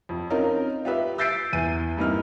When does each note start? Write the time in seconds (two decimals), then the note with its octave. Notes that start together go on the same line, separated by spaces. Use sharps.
0.09 F2
0.30 C4 C#4 D#4 F4 A#4
0.85 F4 G4 B4 E5
1.18 E6 G6 A6 B6 C7 D7
1.53 E2 D#7
1.97 G2 A#3 C4 D#4 E4 F6